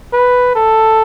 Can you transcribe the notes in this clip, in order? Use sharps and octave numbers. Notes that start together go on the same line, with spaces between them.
B4
A4